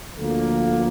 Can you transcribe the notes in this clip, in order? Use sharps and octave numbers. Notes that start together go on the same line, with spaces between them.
D2 D3 F3 A#3 A4